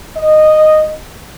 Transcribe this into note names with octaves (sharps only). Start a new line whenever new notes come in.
D#5